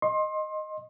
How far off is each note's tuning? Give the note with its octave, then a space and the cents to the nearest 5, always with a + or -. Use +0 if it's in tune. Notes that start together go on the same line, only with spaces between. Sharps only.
D#5 -5 C6 +25